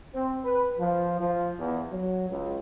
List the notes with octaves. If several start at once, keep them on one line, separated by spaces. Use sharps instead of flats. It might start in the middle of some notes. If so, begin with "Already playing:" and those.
C4
B4
F3
F3
E2
F#3
C#2